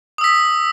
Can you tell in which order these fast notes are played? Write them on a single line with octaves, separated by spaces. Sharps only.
D#6 E6 B6